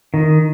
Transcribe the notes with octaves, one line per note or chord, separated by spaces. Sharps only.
D#3